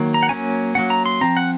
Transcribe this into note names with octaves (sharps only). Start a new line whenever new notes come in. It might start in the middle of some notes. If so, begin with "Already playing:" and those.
Already playing: D#3 F#3 A#3
A#5
F#5
F#3 A#3 C#4 G#5
F#3 A#3 C#4 F#5
A#5
C6
F3 C4 A#5
F#5